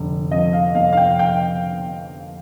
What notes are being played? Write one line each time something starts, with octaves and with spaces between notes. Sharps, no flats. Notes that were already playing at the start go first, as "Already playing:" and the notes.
Already playing: F1 D3
F2 D#5
F5
F1 F5
F5
G5
G5